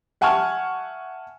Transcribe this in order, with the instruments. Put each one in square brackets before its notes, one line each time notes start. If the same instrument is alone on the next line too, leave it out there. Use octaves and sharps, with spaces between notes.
[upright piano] E5 F#5 G#5 A5 C#6 F6